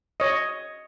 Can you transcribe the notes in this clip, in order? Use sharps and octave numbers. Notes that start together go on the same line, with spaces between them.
C#5 D#5